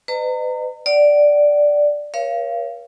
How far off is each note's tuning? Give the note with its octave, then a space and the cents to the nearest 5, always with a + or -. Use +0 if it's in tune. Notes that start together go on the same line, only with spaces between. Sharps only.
B4 +40 D#5 -40 A#5 -35
D5 +0 F#5 +40
A#4 +40 C#5 +0 F5 -30